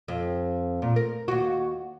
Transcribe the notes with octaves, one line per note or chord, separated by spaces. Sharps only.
F2
A#2
A#4
D#2 F#4